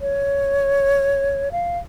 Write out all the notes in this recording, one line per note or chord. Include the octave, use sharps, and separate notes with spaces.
C#5
F5